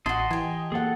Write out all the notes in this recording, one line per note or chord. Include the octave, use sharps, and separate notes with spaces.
A1 E4 F#4 D#5 A5 C6
E3 G4 G#5
A#3 G#4 A4 F#5